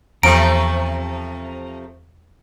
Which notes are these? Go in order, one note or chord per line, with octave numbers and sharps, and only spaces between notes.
E2 C3 F3 A3 A#5 D7